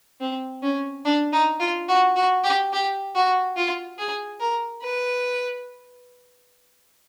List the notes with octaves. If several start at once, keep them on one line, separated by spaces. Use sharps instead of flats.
C4
C#4
D4
D#4
F4
F#4
F#4
G4
G4
F#4
F4
G#4
A#4
B4